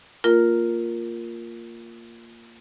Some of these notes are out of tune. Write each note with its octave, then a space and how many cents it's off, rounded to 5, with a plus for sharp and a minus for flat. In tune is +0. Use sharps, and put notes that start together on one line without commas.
A#3 -10 F4 +0 A#4 +5